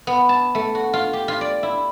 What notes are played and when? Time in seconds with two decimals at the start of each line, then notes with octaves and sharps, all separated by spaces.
0.07 B3
0.29 A5
0.55 A3
0.75 F#4
0.93 F4
1.13 G4
1.28 F4
1.41 D5
1.63 E4